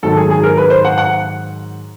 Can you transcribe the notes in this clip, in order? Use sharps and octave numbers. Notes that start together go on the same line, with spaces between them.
G#2 D#3 F#3 A4
G#4
G#4
A#4
B4
C5
F#5
F#5